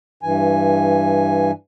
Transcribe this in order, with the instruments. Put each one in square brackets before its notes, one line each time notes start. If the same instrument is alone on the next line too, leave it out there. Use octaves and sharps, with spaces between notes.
[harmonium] G2 E3 G#5